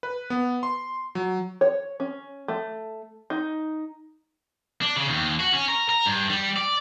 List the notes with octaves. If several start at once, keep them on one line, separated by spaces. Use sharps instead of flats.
B4
B3
C6
F#3
C#5
C#4
A3
D#4
D4
C#3
D#2
F#4
C#4
A#4
A#4
G2
G3
D5